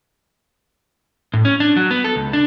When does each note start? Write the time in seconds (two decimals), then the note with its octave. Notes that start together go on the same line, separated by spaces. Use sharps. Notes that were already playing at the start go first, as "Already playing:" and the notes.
1.34 A2
1.45 C#4
1.60 D4
1.77 F#3
1.91 B3
2.04 A4
2.16 C#2
2.33 D4